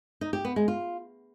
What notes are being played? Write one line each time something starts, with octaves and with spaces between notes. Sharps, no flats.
D#4
G4
B3
G#3
F4